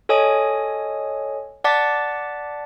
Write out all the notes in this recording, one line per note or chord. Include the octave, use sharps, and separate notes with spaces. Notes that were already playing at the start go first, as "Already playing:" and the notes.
A4 C#5 D#5 G#5 D#6
D5 F#5 A5 D6 A6 B6